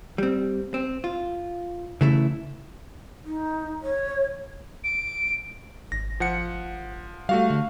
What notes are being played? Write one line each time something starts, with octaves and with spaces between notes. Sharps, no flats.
G3 C4
C4
F4
C#3 E3 A3 E4
D#4
C#5
D7
G#1 A#6
F3 F#5 C#7
G3 A3 F#4 F5
D3